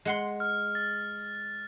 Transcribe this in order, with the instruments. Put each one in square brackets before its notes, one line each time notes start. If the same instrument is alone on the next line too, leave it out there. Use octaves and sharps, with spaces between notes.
[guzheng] G#3 F#5 C6
[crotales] F6
A6